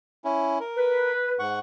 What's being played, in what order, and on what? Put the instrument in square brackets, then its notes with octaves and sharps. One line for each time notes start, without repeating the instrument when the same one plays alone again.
[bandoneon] C#4 E4
A#4
[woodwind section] B4
[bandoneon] G#2 F#5 C#6